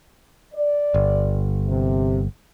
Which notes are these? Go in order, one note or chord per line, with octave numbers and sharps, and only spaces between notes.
D5
G1
C3